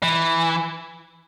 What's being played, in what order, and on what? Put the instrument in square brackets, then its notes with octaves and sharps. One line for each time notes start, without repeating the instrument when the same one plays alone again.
[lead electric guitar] E3